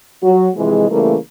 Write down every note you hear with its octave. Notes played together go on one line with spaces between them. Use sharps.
F#3 F#4
C3 E3 F3 G#3
C#3 E3 G3 A3 A#3